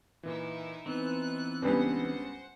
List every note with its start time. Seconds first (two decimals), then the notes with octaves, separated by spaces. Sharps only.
0.23 A#2 E3 D#4 E4
0.86 E3 B3 C4 D#4 F#6
1.62 C#2 G3 B3 D4 G#4 B4 C5 F#5